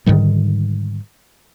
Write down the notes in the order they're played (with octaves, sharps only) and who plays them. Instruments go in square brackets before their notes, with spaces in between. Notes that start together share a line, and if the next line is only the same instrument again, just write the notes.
[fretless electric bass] G#2 D3 D#3 G3